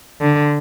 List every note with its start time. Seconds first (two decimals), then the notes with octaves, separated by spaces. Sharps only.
0.21 D3